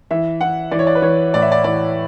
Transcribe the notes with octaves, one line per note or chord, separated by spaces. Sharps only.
E3 E5
E3 F#5
E3 D5
C#5
D5
B4
E3 C#5
A2 D5
E5
D5
E3 D5